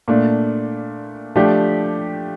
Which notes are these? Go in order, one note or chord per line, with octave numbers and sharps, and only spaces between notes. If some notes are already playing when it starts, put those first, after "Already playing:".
A#2 A3 D4
F3 A3 D4 G4